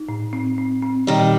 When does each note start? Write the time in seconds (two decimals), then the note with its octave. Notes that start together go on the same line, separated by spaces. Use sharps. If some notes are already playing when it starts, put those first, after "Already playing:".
Already playing: D#4
0.09 A2
0.33 C4
0.58 C4
0.83 C4
1.07 A#2 D#3 G3